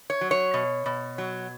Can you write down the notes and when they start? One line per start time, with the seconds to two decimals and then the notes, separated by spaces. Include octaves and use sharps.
0.10 C#5
0.21 F#3
0.31 C#5
0.54 B2
0.86 B2
1.18 F#3